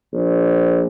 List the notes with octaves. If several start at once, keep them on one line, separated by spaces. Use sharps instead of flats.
A#1